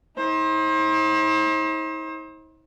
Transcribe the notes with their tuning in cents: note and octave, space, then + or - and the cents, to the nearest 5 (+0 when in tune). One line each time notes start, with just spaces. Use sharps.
D#4 +45 C5 +35